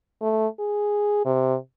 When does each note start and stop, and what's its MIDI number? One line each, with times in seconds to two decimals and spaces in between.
0.22 0.47 57
0.59 1.23 68
1.25 1.56 48